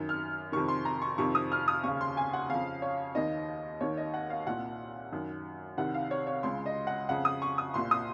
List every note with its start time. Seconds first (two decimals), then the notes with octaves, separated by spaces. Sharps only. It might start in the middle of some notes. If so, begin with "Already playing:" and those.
Already playing: F#2 D#3
0.09 F6
0.52 F2 C3 D#3 C#6
0.68 C6
0.85 A#5
1.02 C#6
1.18 F2 C3 D#3 C#6
1.35 D#6
1.52 F6
1.68 D#6
1.83 D#2 C#3 C#6
2.01 C6
2.17 G#5
2.33 F#5
2.49 F2 C#3 F5
2.82 C#5
3.15 D#2 D#3 D#5
3.80 D#2 D#3 C#5
3.97 D#5
4.14 F#5
4.30 F5
4.47 C2 A#2 F#5
5.12 F#2 D#3
5.77 C2 C3 D#3 F#5
5.94 F5
6.11 C#5
6.27 C#5
6.43 C#2 C#3 C6
6.66 D#5
6.87 F#5
7.09 F2 C#3 F#5
7.25 D#6
7.42 C#6
7.58 D#6
7.74 C2 A#2 C6
7.91 D#6